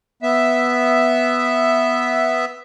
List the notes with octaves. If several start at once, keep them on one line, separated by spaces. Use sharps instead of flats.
B3 E5